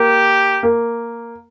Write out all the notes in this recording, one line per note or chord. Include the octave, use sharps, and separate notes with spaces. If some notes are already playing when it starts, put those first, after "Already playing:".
Already playing: A#3 G4
A#3